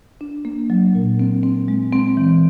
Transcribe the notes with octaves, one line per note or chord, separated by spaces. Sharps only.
D4
A#3
F#3
A#2
C4
C4
G#3
C4
E3